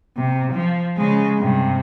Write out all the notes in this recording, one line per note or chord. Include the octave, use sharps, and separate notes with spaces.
C3
F3
C#3 G#3
G2 C3